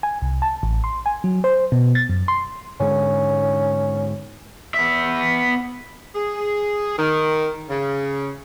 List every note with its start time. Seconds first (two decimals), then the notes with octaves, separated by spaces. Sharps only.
0.03 G#5
0.22 C2
0.42 A5
0.63 A1
0.84 C6
1.06 G#5
1.24 F#3
1.44 C5
1.72 B2
1.95 A6
2.09 F#2
2.28 C6
2.80 G#2 D3 G#3 C#4
4.74 B3 E5
6.15 G#4
6.99 D#3
7.69 C#3